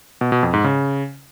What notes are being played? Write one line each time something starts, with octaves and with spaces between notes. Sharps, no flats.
B2
B2
F2
G#2
C#3